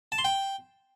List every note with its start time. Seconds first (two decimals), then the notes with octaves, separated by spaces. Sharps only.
0.12 A5
0.18 C6
0.25 G5